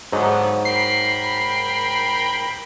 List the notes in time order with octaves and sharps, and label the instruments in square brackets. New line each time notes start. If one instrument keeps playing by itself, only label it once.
[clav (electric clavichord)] G#2 F#3 D#4 [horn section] D3 F3 B3
[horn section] A#4 G5 B5 [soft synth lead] C7